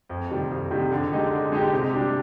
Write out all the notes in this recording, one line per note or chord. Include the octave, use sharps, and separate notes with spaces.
F2
C3 D#3 G3
F2
C3 D#3 G3
D3
G#3 D#4 G4
D3
G#3 D#4 G4
C3
G3 D4 G4